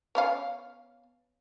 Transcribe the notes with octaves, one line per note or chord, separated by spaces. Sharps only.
B3 C#4 F5